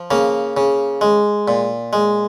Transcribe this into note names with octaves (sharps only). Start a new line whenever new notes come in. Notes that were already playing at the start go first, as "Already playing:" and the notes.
Already playing: F3
C#3 A#3
C#3
G#3
A#2
G#3